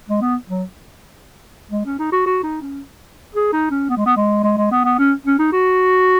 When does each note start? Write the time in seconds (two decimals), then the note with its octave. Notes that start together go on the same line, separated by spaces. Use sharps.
0.08 G#3
0.21 B3
0.49 F#3
1.71 G#3
1.85 C#4
1.99 D#4
2.12 F#4
2.26 F#4
2.43 D#4
2.62 C#4
3.35 G#4
3.53 D#4
3.71 C#4
3.90 B3
3.97 G#3
4.06 B3
4.17 G#3
4.44 G#3
4.57 G#3
4.71 B3
4.84 B3
4.99 C#4
5.25 C#4
5.39 D#4
5.53 F#4